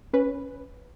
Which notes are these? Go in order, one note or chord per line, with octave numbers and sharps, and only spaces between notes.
C#4 B4